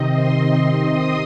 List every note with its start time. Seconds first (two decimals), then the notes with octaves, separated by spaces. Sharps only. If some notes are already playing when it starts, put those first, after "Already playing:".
Already playing: C3 D#3 C4 D#5
0.11 C6
0.89 D#6